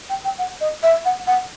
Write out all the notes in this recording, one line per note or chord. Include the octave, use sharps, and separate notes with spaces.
G5
G5
F#5
D#5
E5
F#5
F#5